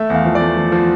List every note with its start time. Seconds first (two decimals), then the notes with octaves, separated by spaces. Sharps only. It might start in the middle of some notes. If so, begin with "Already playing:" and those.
Already playing: A3 E5
0.10 E2 F5
0.25 F3
0.35 D5
0.41 A3
0.56 F3
0.72 F3